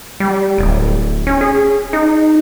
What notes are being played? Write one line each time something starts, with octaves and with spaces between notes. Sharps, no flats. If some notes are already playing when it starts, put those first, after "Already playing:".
G3
D1
C#4
G#4
D#4